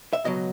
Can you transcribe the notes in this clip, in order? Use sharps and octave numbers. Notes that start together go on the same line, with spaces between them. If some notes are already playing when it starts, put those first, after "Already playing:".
E5
C#2 B2 F#3 D#5